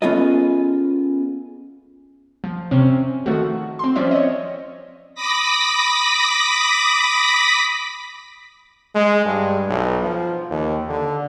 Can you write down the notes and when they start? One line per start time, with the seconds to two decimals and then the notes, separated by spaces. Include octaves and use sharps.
0.02 B3 C#4 F4 G#4 A4 D#5
2.44 F3
2.71 C3 C4 C#4
3.26 D#3 F3 A3 F#4
3.79 C4 C6
3.96 F3 C4 C#4 D5 E5
4.11 C#5 D#5
5.14 B5 D6 D#6 A#6 B6
8.95 G#3
9.25 G2
9.68 B1
10.02 F3
10.50 D#2
10.89 D3